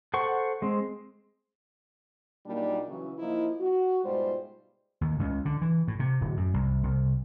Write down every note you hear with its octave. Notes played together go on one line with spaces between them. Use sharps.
A4 C5 F#5 C#6
G#3 C4
A#2 F#3 G3 A#3 D4 D#4
C#3 E3 F#3
F3 A#3 D#4 E4
F#4
G#2 B2 G3 G#3 F4 C5
D#2
C#2
D3
E3
A2
C3
D1
F#2
C2
C2